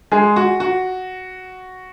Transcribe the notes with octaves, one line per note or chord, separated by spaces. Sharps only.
G#3 G#4
F#4
F#4